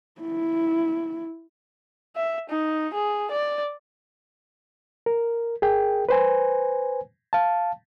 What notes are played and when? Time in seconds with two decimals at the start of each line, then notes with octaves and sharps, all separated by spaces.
0.21 E4
2.16 E5
2.50 D#4
2.94 G#4
3.31 D5
5.06 A#4
5.62 G#4 A#4 G5
6.09 B4 C5 G#5
7.33 F5 A5